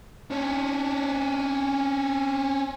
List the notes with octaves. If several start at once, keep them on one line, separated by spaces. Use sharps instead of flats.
C#4 D4